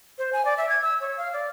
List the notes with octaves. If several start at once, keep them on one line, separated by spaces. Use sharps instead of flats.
C5
G#5
D5
E5
G#6
E6
C#5
F5
D5